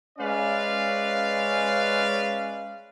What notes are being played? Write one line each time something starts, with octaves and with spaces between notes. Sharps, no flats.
G#3 C#4 B4 D5 F5